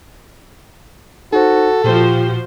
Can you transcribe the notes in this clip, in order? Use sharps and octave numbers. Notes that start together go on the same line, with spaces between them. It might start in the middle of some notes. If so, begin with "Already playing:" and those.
D#4 F#4 A4 C5
A#2 F3 F#4 G4 C5